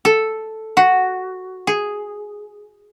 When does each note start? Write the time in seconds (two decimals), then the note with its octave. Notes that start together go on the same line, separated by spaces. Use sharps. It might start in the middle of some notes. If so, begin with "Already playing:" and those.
0.05 A4
0.77 F#4
1.67 G#4